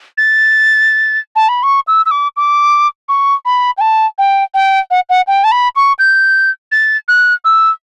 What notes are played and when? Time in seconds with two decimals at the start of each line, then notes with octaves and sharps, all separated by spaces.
0.18 A6
1.36 A5
1.49 B5
1.63 C#6
1.87 E6
2.06 E6
2.11 D6
2.37 D6
3.09 C#6
3.45 B5
3.78 G5
3.81 A5
4.18 G5
4.54 G5
4.91 F#5
5.09 F#5
5.27 G5
5.44 A5
5.52 B5
5.76 C#6
5.99 G6
6.72 A6
7.08 F#6
7.45 E6